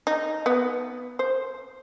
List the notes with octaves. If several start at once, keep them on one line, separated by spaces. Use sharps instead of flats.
D#4
B3
C5